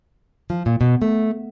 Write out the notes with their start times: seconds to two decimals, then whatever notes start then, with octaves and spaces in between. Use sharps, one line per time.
0.50 F3
0.66 A#2
0.81 B2
1.02 A3